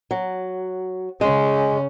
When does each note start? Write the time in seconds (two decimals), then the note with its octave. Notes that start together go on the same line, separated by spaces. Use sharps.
0.11 F#3
1.21 C#3 G#3 C#4